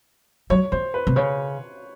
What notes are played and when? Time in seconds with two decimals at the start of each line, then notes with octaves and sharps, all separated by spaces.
0.50 F#3 C#5
0.72 E3 C5
0.94 B4
1.07 C3
1.16 C#3 C#5